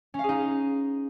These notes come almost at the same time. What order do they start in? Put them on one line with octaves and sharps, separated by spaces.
C#4 F5 G#4 D#4